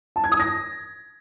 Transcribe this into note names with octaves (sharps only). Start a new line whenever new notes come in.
A5
G#6
D#6
A#6